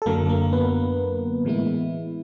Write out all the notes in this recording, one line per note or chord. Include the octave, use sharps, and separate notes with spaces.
A4
F#2 D3 F#3 A#3 A#4
A#3 A#4
B3 B4
A2 E3 G#3 B3 E4